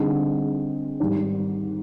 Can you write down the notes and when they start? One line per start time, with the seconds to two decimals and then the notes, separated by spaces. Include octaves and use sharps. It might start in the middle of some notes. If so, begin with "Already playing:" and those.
Already playing: D3 G3 C4 D#4 G#4
1.00 G#2 D#3 G3